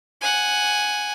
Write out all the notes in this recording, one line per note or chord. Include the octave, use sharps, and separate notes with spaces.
F#5 G#5